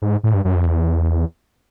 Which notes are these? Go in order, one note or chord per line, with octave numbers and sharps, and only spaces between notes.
G#2
A2
G2
F#2
F2
E2